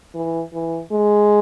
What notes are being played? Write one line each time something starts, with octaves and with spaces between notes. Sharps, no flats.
E3
E3
G#3